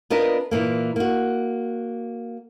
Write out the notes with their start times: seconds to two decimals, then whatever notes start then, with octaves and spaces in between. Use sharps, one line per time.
0.10 B3 D4 F4 A#4 B4 D#5
0.51 A#2 E3 A#3
0.96 A#3 F#4